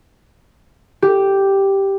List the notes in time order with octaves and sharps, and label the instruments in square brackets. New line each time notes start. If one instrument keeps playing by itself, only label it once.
[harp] G4